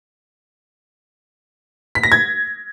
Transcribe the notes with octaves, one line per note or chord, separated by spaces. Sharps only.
B6
A#6
G#6